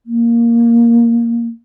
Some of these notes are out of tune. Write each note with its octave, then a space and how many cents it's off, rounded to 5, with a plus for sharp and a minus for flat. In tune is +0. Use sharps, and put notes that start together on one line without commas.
A#3 +0